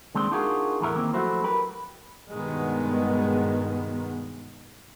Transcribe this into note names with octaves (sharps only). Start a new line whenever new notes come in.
D#2 G#3 C4 D4 C6
D4 D#4 F4 F#4 G#4 A#4
E2 A2 E3 A#4 E5
D#3 A#3 C4
F3 F#3 A3 E4 F#4 C5
G4 A#4 B4
G2 B2 D#3 G#3 B3